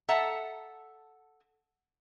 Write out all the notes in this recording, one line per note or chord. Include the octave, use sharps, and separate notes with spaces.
A4 E5 F#5 A5 A#5